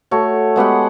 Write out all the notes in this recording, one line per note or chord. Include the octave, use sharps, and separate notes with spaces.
A3 F#4 C#5
G#3 B3 G4 F#5